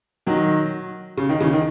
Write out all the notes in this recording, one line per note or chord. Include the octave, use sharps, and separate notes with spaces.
D#3 F#3
C#3
D#3
C#3 E3
D#3